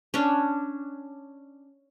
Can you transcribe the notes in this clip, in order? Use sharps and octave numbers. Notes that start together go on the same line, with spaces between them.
C#4 D4